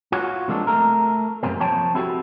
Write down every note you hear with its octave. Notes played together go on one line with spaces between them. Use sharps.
F4 F#4 C#5
C3 F3 G#3 A#3 C4 D4
A3 A#4
F#2 A2 C3 A#3 C4
F3 C#5 G5 A5
C4 E4 F#4 G4 A4